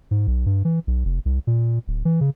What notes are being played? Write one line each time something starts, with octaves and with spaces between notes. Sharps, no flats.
G#2
B1
G2
E3
B1
F1
C2
A#2
D1
E3
C#3